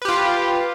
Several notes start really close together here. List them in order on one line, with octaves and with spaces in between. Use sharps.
B4 G4 F4